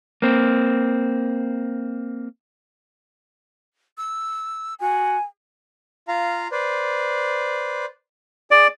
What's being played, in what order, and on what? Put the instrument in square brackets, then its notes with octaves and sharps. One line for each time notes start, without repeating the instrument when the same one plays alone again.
[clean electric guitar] A#3 C4
[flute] E6
[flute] F#4 [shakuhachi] G#5
[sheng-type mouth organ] F4 F5 A#5
B4 C5 D5
[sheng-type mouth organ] G#4 D#6 [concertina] D5